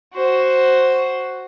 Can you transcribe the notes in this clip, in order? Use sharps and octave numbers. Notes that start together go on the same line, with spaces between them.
F#4 C5